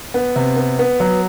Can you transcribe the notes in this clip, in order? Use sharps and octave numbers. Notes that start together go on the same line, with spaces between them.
B3
C3
B3
B3
F#3